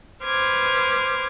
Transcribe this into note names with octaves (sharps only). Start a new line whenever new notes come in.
B4 C5 D6 F6 G#6